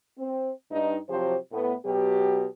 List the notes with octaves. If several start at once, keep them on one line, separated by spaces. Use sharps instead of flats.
C4
G2 D#4
C3 F3 F#3 G4 C5
A2 B3
B2 F#3 G4